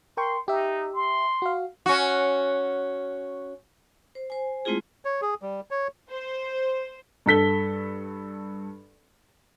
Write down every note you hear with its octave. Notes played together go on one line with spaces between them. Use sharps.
A#4 G5 C6 C#6
D#4 G4 E5
C6
F#4 F5
C#4 F#4
C5
C5 G#5
G#3 A3 C4 E4 F4 G#4
C#5
G#4
G3
C#5
C5
G2 A4 B6 G7